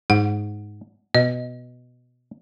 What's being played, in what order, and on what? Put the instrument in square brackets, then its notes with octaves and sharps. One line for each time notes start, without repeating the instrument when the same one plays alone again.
[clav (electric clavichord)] G#2 [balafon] F#5
[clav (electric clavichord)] B2 [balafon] D#5